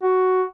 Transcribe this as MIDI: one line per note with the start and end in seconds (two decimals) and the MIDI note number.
0.03 0.43 66